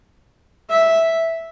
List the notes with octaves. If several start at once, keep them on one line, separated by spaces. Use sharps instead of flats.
E5